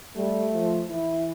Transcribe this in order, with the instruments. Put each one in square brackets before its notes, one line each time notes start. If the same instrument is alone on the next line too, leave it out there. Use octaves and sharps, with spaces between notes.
[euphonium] G3 [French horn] A3
[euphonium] F3
[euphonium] E3 [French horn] E4